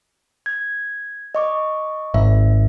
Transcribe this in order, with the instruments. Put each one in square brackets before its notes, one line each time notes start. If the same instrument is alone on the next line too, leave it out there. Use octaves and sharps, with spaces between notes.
[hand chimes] G#6
D#5 C#6 D6
[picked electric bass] G#1 [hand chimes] E5